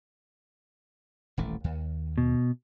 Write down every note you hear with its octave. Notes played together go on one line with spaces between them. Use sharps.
D#1 A1 A3
D#2
B2